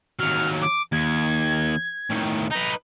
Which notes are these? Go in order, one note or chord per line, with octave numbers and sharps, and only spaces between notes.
D#2 F#3 F6
D6
D#2 G#6
A2 D#3
D#4 B4 A#5